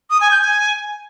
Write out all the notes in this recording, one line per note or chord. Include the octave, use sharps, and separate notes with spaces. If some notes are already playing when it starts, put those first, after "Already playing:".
D#6
G#5
G6
G#5